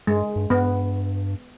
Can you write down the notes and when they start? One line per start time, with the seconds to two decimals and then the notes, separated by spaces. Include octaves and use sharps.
0.07 G2 G#3
0.36 G2
0.50 G2 B3